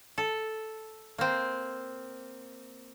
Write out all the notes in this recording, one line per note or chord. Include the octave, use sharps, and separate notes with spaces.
A4
A#3 C4